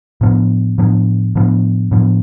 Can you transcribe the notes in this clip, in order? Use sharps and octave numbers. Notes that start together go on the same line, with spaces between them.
A2 F3 B3 D4
A2 F3 B3 D4
A2 F3 B3 D4
A2 F3 B3 D4